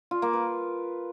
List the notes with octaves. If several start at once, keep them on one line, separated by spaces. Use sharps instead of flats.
F4
A#3
B4